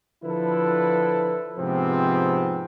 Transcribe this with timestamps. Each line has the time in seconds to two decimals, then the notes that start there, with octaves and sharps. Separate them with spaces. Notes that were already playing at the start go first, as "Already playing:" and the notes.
0.24 D3 F3 E4 A4 B4
1.58 G#2 C3 F3 B3 C4